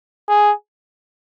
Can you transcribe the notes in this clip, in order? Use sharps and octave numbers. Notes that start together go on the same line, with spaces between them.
G#4